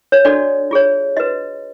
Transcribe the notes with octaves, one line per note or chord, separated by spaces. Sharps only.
C#5
D4 F#4 A4 D5
F4 G#4 C#5
F#4 B4 D#5